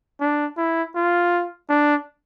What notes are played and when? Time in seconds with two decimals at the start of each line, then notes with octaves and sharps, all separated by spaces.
0.21 D4
0.57 E4
0.95 F4
1.69 D4